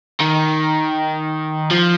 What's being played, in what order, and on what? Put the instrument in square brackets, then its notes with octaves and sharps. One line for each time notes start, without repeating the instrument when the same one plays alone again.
[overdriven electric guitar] D#3
F3